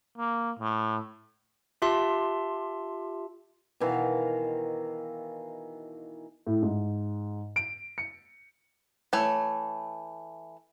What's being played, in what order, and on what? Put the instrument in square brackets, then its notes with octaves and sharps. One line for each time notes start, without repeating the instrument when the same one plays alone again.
[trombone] A#3
A2
[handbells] F4 G4 E5 A5 C6
[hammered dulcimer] B2 D#3 E3 F5
[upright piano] A2
G#2
D7
C#7
[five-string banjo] E3 A3 C#5